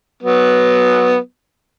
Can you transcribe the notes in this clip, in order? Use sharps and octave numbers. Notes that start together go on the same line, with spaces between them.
F#3 B3